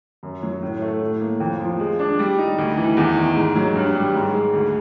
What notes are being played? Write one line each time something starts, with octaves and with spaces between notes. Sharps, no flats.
F#2
F#3
A2
A3
A2
A#3
F2
F3
G#3
D4
G3
D#4
D2
E3
E2
D#3
G#2
F#3
G2
G3
G#2
G#3
D2